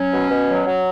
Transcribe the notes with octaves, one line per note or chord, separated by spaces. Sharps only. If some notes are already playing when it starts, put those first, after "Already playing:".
Already playing: F#3 C#4
B2
B2
F#3
F#3